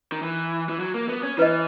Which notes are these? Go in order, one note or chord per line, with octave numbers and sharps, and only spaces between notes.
D#3
E3
E3
F#3
A#3
B3
C#4
E3 E4 B4 D#5